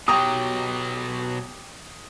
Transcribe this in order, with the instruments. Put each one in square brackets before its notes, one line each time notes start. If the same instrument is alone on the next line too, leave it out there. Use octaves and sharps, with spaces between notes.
[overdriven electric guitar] B2 F#3 [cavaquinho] G4 A#5 C#6 [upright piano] D#6